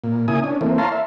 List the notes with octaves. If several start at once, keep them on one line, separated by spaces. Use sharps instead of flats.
A#2
C#3 A#3 E4 G#5 D#6
C#4 D4
E3 A3 A#3 C4
C#5 F5 A5 A#5 C6
E5